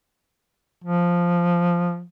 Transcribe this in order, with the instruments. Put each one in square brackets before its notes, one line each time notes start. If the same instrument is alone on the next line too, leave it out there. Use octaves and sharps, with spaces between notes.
[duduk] F3